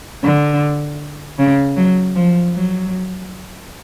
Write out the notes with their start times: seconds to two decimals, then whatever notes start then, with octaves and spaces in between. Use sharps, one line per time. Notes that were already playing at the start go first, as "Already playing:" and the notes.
0.23 D3
1.39 C#3
1.76 F#3
2.15 F3
2.54 F#3